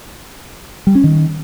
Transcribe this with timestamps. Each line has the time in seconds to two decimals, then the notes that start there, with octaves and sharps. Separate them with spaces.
0.87 G3
0.95 C#4
1.04 D#3